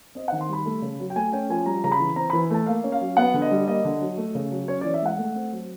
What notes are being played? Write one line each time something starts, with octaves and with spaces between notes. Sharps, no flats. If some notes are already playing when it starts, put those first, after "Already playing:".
C4 D#5
F#5
D#3
C6
G3 B5
A3
C#3
F#3
G5
A3 G#5
C#4 G5
F3 G#5
G3 A#5
C#3 A#5
B5
E3
C4 A#5
E3 B5
A3 A5
A#3 F5
C#4
F5
F#3
B3 F#5
D3
D#5
G3
A#3 D#5
D3
F#3
A3
C#3
F#3
C#4 C#5
E3 D5
E5
G#3 F#5
A3
C4
F#3